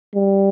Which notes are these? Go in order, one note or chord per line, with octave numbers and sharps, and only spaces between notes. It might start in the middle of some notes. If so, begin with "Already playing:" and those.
G3